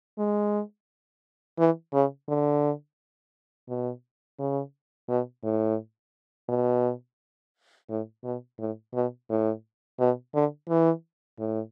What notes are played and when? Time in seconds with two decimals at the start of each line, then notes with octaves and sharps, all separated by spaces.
0.18 G#3
1.58 E3
1.93 C#3
2.28 D3
3.69 B2
4.39 C#3
5.09 B2
5.44 A2
6.49 B2
7.89 A2
8.24 B2
8.59 A2
8.94 B2
9.29 A2
9.99 B2
10.34 D3
10.69 E3
11.39 A2